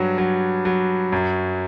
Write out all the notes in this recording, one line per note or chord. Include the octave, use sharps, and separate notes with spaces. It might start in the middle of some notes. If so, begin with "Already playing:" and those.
Already playing: G2 F#3
F#3
F#3
F#2